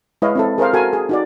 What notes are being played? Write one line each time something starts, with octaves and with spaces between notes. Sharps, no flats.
G#3 E4 B4 C#5 D#5 F5
C4 E4 A4
G#4 A#4 C5 F5
F#4 A4 A#4 F5 G#5
G#4
D#4 F#4 D5